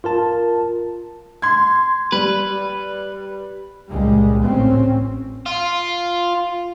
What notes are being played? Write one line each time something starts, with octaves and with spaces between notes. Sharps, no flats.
F4 A#4 A5
C6 G#6
G3 B4
C#2 A#2 G3 G#3
A1 C4 C#4
F4